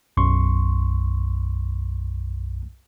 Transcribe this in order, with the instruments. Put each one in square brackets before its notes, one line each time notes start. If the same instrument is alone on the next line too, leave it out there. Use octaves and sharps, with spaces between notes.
[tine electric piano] B1 F#2 C6 C#6